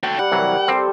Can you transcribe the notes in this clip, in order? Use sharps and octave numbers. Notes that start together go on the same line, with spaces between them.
F#4 A4 G5
G3 F#5
C2 E3 F#3 A#4
G3 C4 A4 C5